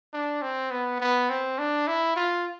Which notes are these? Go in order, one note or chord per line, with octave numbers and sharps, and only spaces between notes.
D4
C4
B3
B3
C4
D4
E4
F4